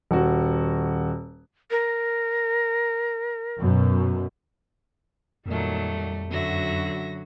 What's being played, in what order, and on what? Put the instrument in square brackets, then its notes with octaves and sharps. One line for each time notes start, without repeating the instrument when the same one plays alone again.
[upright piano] D#1 F#4
[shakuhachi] A#4
[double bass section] F#2 B2
[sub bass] F2 [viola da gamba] A#2 D#3 F#3 [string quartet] G3 A3
[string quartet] F#2 E5 A#6 [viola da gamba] D3 F#3 F#4